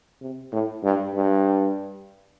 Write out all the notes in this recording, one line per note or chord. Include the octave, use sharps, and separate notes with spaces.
C3
A2
G2
G2